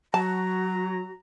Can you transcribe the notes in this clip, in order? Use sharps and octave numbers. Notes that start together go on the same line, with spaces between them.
F#3 F#4 A5 A#5